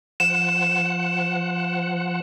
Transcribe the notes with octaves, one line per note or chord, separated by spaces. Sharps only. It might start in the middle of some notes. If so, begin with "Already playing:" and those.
F3 F#5 E7